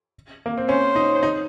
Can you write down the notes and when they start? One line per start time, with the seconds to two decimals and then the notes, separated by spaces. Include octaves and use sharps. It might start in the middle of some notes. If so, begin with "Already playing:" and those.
0.46 A#3
0.58 C4
0.69 C#4 C5
0.96 D#4
1.23 D#4